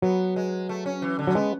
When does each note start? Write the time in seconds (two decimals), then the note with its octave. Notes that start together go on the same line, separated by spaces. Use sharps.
0.02 F#3 B3
0.36 G#3
0.69 A3
0.86 C#4
1.02 E3
1.19 D3
1.27 F#3
1.30 C#4
1.35 G#3 B3